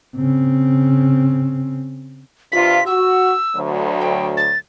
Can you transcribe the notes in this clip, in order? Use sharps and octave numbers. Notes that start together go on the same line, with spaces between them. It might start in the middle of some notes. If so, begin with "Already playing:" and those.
C#3 C4
G2 C3 F4 B6
F#4 E6
D2 F#3
G5
A6